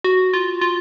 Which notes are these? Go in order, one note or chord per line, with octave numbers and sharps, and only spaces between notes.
F#4
F4
F4